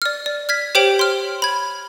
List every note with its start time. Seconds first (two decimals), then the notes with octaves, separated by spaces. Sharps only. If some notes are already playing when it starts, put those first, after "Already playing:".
0.02 D5 F6
0.26 D5
0.49 F6 G#6 B6
0.75 G4 C5 C#5 G5 D7 F#7
0.99 C6 F6
1.42 B5 G#6